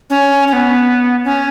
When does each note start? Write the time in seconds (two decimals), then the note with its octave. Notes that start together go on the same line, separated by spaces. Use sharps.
0.10 C#4
0.48 C#4
0.53 B3
1.24 C#4